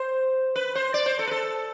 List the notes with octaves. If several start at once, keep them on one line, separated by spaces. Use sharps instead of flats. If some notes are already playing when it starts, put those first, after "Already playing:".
Already playing: C5
B4
C5
D5
C5
A4
B4
A4